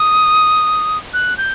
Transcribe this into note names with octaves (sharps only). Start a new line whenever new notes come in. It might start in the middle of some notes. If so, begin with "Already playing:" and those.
Already playing: D#6
F#6
G6